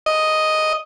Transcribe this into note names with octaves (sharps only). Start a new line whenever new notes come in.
D#5